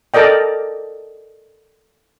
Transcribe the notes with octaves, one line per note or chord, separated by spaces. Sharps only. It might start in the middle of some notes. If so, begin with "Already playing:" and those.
A4 A#4 D5 D#5 G5